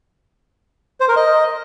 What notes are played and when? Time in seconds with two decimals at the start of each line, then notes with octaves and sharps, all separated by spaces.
1.00 C5
1.08 A#4
1.16 D#5